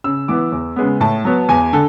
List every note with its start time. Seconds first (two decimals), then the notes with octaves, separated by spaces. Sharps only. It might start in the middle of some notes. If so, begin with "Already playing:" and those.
0.04 C#3 E6
0.28 E3 B3 D6
0.52 E2
0.76 C#3 G#3 B3
1.00 A2 A5
1.25 F#3 B3
1.49 E2 G#5
1.73 D3 A4